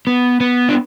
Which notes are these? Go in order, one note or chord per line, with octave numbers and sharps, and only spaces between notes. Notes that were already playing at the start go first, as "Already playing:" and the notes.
B3
B3
D4